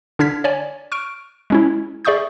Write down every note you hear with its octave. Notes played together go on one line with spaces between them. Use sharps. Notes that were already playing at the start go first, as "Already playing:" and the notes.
D3 D4 F6 G#6 B6
C#5 D5 G#5
C#6 F6 D7
G#3 C#4 E4
G#4 D5 E5 C#6 D#6 G6